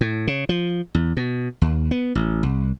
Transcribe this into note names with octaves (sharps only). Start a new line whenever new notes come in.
A2
C#3
F3
E2
B2
D#2
B3
A1
C2